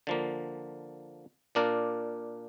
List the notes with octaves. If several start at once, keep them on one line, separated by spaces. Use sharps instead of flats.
D3 F3 A#3
A#2 A#3 D4 A#4 D5